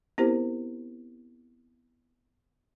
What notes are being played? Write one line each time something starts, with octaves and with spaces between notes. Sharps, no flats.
B3 C4 E4 G4 A#4 C5